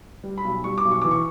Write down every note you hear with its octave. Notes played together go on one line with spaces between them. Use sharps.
G3
B5
B1
G3 C#6
D6
B1
C#6
E3 D6
C#6